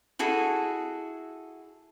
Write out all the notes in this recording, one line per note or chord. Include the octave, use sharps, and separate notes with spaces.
E4 F#4 G#4 A4